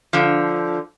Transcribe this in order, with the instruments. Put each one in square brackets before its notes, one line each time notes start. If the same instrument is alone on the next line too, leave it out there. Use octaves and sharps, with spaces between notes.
[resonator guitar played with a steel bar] D3 F3